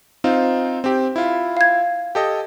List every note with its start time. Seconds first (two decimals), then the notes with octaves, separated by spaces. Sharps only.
0.24 C4 D#4 F4
0.84 C4 G4
1.16 E4 F4
1.57 F5 G#6
2.15 G4 A4 D#5